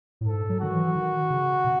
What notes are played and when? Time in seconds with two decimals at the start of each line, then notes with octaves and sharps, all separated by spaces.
0.21 A2
0.27 G#2 A4
0.49 F#3
0.60 D#3 F#4
0.72 E3
0.95 D#3
1.30 C#3
1.64 B2